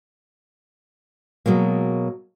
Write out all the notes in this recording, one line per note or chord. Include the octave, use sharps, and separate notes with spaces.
B2 F#3 G#3 A#3